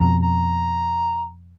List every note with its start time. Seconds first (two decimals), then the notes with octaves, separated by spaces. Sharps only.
0.01 F2 B2 A#5
0.23 A#5